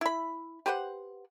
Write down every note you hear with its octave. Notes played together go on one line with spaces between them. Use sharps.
E4 B5
G4 B4 C5 F#5